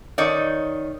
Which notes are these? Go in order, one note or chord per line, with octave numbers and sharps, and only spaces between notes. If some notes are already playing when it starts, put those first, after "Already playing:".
D#3 D#4 C#5 D5